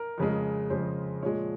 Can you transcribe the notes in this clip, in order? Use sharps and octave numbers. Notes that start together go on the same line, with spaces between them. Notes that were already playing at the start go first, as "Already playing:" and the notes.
Already playing: A#4
F2 C#3 G#3
F2 C#3 G#3 C5
A#2 F3 G#3 C#5